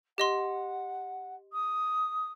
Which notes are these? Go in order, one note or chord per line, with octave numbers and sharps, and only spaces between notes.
G4 D#5 F#5 C6
D#6